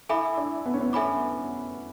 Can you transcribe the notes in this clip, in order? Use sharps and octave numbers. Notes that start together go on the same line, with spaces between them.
E4 A4 E5 G#5 B5 D6
D4
B3
C#4
B3
C#4 A4 E5 G#5 B5 D6